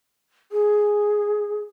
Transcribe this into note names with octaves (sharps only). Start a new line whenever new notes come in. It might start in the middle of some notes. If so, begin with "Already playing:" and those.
G#4